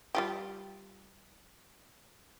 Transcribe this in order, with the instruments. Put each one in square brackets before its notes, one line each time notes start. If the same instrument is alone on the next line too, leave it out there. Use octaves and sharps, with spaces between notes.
[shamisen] G3 F4 G4